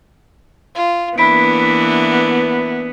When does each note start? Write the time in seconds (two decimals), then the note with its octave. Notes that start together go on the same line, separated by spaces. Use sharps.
0.75 F4
1.18 E3 A#3 B3 D4 E4 B5 B6 D7